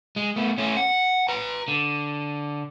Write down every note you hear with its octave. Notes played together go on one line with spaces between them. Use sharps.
G#3
A3 B3
A3 C#4
F#5
B4 A#5
D3